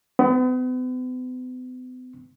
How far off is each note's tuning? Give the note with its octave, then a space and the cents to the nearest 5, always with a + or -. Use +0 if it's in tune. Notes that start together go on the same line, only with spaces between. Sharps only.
B3 +45